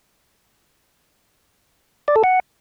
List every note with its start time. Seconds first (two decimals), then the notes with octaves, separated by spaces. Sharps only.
2.08 D5
2.16 A4
2.24 F#5